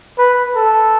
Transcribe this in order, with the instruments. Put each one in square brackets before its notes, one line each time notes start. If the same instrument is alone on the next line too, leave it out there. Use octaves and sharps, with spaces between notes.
[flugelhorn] B4
A4